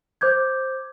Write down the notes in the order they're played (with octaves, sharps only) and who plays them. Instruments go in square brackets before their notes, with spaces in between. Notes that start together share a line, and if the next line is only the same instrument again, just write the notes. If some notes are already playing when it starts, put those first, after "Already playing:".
[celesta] C5 D6 G6 G#6